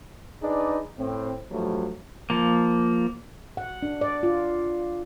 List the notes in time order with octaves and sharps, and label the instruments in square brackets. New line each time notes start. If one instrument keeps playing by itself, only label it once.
[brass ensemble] D4 D#4 G#4 B4 D5
A2 C4
G2 F3 F#3 A3
[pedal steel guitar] F3 A#3
[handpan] F#5
D4
D5
F4